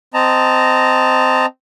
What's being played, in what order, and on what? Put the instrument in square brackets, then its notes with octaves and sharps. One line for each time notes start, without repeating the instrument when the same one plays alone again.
[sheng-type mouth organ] C4 D#5 A5 A#5